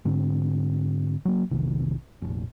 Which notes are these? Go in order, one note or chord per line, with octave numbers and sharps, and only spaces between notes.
G#2 D3 C4
F#3 A#3
F1 B1 C3 D#3
F1 A#1